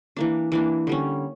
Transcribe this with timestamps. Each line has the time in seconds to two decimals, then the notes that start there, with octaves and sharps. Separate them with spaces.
0.17 E3 A#3 D4
0.52 E3 A#3 D4
0.87 D3 G3 C#4